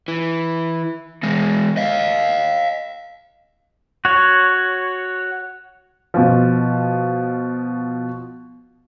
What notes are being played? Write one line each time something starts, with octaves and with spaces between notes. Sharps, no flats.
E3
E3 G#3
D#5 F5
F#4 C#5
B2 F3